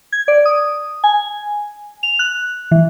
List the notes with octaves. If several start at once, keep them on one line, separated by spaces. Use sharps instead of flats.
G#6
D5
D#6
G#5
F7
F#6
E3